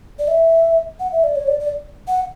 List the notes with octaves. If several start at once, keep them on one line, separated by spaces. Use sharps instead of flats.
D5
E5
F#5
E5
D5
C#5
D5
D5
F#5